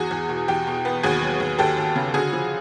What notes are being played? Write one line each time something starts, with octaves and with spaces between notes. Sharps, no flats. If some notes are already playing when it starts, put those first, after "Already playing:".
Already playing: E2 F#4 G#4
E2
B2
E2 G4
B2
B3
D#2 F#4 G#4
F#3
D#2
D#2 G4 A4
D#2
C#3
D3 F#4 G#4
F3